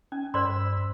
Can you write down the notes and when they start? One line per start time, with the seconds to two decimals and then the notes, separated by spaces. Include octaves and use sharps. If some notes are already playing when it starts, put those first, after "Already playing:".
0.12 C#4 G#5
0.34 G2 C5 D5 B5 C6 E6